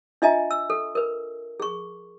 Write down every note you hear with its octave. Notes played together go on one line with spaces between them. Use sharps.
D4 F4 D#5 E5 G#5 A#5
E6
A4
A#4 B4
G#4 C#6